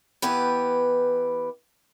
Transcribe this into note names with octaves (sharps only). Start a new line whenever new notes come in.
E3 B3 G4 B4